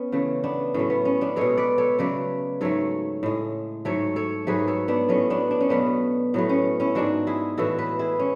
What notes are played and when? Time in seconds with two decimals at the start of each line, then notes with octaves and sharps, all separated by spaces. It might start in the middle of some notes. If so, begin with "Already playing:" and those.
Already playing: B3 C#4
0.12 C#3 E3 A3
0.44 B3 D4
0.74 A2 F#3 A3 C#4
0.90 B3
1.05 C#4
1.21 B3 D4
1.36 B2 G#3 A4 C#5
1.57 B4 D5
1.78 A4 C#5
1.99 C#3 F#3 A3 B4 D5
2.61 G#2 F#3 A3 A4 C#5
3.23 A2 G#3
3.85 G#2 F#3 A3 A4 C#5
4.16 A4 C#5
4.47 G#2 F#3 A3 G#4 B4
4.68 A4 C#5
4.88 B3 D4
5.09 A2 F#3 A3 C#4
5.30 B3 D4
5.51 D4
5.61 C#4
5.69 B2 F#3 A3 B3 D4
6.34 A2 F#3 A3 B3
6.49 C#4
6.80 C#4 E4
6.95 G#2 G#3 D4 F#4
7.27 E4 G#4
7.58 A2 E3 G#3 F#4 A4
7.79 G#4 B4
7.99 E4 G#4
8.19 C#4